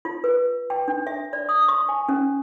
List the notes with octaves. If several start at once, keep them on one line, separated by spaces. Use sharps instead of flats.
F4
B4
G5
D4
E5
D5
D#6
C#6
G#5
C#4